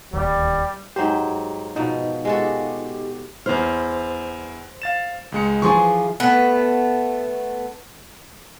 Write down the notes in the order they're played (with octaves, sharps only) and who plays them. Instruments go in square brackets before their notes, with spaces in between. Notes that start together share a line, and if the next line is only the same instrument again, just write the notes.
[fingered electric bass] D1 D#2 [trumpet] G3
[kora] G#2 F#3 C5 [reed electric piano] G4
[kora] B2 F3 [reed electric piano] D#4 [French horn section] F4
[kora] G#3 F#4 A4 [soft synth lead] G4
[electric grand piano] E2 E4 F6 [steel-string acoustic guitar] C5
[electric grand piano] F5 A6 E7
C#2 G#3 C#7
[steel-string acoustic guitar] E3 F3 G#4 [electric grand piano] G#5 C6 C#6
[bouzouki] A3 B3